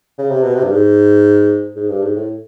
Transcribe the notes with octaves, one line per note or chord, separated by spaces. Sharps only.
C#3
C3
B2
C3
G2
G#2
G#2
G2
G#2
A2